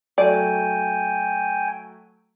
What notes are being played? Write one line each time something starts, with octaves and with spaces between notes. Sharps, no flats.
F#3 A3 D5 G5 G#5